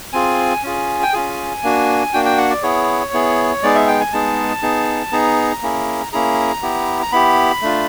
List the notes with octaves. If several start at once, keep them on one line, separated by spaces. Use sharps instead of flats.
C4 F4 G#4 G#5
C#4 F4 G#4
G5
C#4 F4 G#4 G#5
A#3 D4 F#4
A#3 D4 F#4 G5
G5
F#5
D5
B3 E4 G#4 C#5
B3 E4 G#4
G#3 B3 D#4 G#4 D5
E5
G5
G#5
G#3 B3 D#4 G#4 A5
B3 D#4 G#4
B3 D#4 G#4 A#5
A#3 C#4 E4 G#4
A#3 C#4 E4 G#4 A#5
B3 E4 G4
A#5
B3 E4 G4 B5
A3 D4 F4